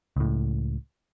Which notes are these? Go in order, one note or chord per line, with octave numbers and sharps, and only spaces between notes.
C#2 A2